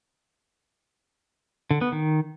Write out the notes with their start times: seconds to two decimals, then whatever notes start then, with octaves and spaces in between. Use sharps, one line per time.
1.71 D3
1.81 B3
1.92 D#3